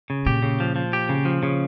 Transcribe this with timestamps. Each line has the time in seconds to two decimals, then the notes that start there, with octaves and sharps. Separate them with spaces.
0.10 C#3
0.26 A#2 G4
0.43 C#3
0.60 F3
0.76 F3
0.93 G4
1.09 C#3
1.25 F3
1.43 C#3